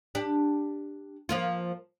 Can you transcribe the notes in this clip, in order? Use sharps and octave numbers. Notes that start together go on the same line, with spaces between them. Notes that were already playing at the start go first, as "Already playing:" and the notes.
D4 G4
F3 A#3 F4